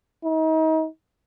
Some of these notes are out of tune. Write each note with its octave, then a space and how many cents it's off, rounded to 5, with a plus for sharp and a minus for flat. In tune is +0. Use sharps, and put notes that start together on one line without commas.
D#4 +35